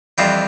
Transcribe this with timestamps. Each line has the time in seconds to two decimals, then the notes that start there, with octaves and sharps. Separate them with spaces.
0.18 F2 E3 G3 C4 F4